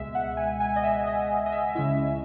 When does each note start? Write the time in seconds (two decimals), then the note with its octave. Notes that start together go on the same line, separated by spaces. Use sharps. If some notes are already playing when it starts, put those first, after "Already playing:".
Already playing: C#2 B2 G#3 E5
0.15 F#5
0.37 G#5
0.60 G#5
0.76 D#5
0.84 E5
1.07 D#5
1.46 D#5
1.52 E5
1.75 C#2 C#3 G#3 C#4 E4 E5